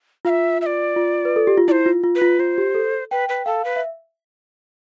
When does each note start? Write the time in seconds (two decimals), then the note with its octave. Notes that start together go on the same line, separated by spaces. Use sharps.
0.25 F4 F5
0.29 E5
0.61 E5
0.66 D5
0.96 F4
1.25 B4
1.36 A4
1.47 G4
1.57 F4
1.68 E4 D5
1.72 C5
1.86 F4
2.04 F4
2.15 B4
2.22 F4
2.39 F4 C5
2.58 G4
2.75 A4
3.11 B4 G5
3.29 B4
3.46 A4 F5
3.65 B4
3.76 E5